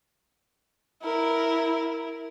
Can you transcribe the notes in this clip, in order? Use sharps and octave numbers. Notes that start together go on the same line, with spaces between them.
E4 A#4